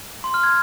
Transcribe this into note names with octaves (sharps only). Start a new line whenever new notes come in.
C6
F6
G#6